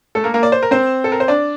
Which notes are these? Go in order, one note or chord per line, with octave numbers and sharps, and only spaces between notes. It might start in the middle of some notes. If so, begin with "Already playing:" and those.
A3 A4
A#3 A#4
A#3 A#4
D5
C5
A#4
C4 C5
A4
A#4
C5
D4 D5